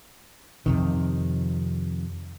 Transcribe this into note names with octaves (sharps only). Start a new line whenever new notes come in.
F2 C3 D#3